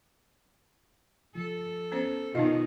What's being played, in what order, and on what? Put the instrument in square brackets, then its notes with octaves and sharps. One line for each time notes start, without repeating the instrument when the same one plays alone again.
[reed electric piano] F3 [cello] A4
[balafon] B3 C#4 C5
[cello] B2 D#3 [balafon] B3 D#4 D#5 [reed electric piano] F4